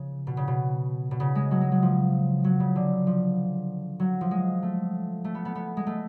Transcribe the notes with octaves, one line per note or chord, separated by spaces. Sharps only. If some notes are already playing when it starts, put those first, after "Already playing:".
Already playing: C#3 F3
B2
C#3
B2
B2
C#3
G#3
F#3
G#3
F#3
F3
F#3
C#3
D3
F3
F#3
F3
G#3
A3
A3
B3
B3
B3
G#3
A3